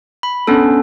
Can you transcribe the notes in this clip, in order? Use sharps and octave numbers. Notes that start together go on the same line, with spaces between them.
B5
B3 C#4 D4 A4